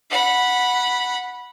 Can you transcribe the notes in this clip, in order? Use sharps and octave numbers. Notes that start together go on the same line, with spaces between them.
F#5 B5